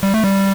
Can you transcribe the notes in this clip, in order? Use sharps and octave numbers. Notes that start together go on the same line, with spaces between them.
G3
A3
G3